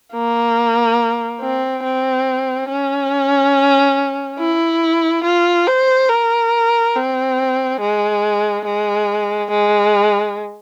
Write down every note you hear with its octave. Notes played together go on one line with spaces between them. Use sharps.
A#3
C4
C4
C#4
E4
F4
C5
A#4
C4
G#3
G#3
G#3